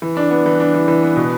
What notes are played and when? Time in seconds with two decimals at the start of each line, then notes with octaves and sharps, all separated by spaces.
0.02 E3
0.17 D4
0.31 B3
0.46 E3
0.60 D4
0.74 E3
0.88 E3
1.03 B3
1.16 B2